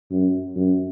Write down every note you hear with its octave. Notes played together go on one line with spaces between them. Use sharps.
F#2
F#2